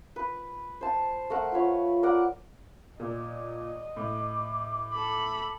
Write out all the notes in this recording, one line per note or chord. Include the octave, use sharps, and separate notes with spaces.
B4
C5 A5
A3 A#4 F#5
F4 B4 C#5
A#4 D5 F#5
A#2 D#5
A2 D6
A4 B5